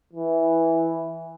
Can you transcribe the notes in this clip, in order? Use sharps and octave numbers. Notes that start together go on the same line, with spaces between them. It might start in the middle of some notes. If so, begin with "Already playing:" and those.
E3